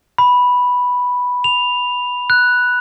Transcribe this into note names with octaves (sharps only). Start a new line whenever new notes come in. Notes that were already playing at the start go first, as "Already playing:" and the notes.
B5
F7
F#6